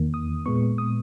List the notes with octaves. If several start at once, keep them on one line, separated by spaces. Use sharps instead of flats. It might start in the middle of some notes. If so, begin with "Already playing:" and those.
Already playing: E2 D#3 A#3
D#6
A#2 G#3 B3 C#6
D#6